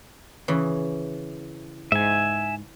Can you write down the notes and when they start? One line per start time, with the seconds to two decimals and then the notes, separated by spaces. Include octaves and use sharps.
0.48 C#3 E3
1.92 G#2 E5 G#5